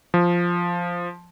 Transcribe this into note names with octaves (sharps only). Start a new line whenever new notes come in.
F3